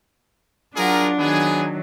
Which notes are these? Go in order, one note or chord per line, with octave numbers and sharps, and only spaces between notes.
F#3 D4 F4 G#4 A#4 F#5
D#3 F#3 B3 G#4